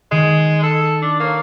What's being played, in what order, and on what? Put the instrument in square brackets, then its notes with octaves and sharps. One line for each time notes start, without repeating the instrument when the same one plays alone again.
[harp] D#3 C7 C#7 [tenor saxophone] G#3
[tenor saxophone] A4
D4
[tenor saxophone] A#3 [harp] C#5 C#6